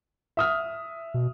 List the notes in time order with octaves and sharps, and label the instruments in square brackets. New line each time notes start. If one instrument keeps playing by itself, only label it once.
[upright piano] E5 D#6 F6
[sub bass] B2